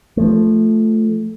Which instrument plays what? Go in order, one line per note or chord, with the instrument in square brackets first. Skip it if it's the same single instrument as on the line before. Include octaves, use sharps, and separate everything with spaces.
[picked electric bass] F3 A3